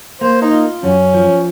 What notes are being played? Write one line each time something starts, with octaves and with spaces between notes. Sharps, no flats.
A#3 C5
D#4
F4
F#2 C#4
F3